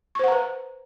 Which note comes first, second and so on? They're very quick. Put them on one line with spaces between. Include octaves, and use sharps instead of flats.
C#6 C5 F#5 A#5 B4